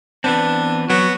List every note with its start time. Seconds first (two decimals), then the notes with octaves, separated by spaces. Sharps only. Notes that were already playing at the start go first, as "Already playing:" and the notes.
0.24 E3 B3 C4 D4
0.90 F#3 B3 F#4